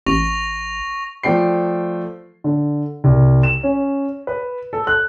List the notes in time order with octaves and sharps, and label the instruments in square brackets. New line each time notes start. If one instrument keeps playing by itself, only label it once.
[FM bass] A1 [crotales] C#6 A#6 F7
[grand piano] F3 A3 D5 G5 C7
D3
C2
E7
C#4
B4
A4
F#6